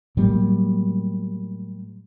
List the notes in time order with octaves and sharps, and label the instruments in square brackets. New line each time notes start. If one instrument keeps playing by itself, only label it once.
[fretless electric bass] A2 F#3 G3 A#3